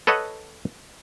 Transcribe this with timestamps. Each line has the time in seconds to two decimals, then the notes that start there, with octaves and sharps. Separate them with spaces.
0.07 A4 B4 C#5 D#5 F#5